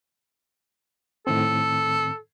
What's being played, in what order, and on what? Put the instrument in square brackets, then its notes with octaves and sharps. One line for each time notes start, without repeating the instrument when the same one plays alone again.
[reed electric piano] A2 D#3 C4 [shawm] A4